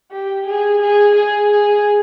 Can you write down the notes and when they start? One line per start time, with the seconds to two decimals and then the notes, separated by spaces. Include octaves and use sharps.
0.12 G4
0.47 G#4
0.82 G#4
1.15 G#4
1.51 G#4